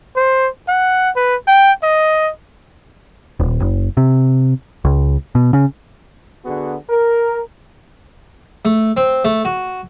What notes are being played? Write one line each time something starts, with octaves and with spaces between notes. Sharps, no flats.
C5
F#5
B4
G5
D#5
D#1
F#1
C3
C#2
B2
C#3
D3 B3 F#4 G#4
A#4
A3
C4
A3
F#4